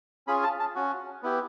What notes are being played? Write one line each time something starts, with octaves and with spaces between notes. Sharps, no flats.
C#4 F4 G#4 B5
A5
A5
C#4 F#4
B3 E4 G4